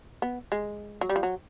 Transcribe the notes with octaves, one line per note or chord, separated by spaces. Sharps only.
B3
G#3
F#3
G3
F3
F#3